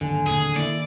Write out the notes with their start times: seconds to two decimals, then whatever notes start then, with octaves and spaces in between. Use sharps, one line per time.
0.01 G#1 D#2 D3 G#5
0.26 D1 D#2 G#4
0.56 D#3 A#3 E4 D5